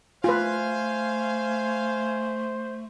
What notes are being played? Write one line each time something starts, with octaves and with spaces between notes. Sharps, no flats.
A3 F4 B4 C5 F5 G#5